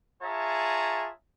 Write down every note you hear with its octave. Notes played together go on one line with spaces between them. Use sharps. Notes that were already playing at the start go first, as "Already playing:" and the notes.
F4 G#4 C#5 E5 A5 A#5